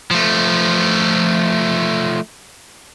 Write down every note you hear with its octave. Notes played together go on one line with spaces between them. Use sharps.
F3 A3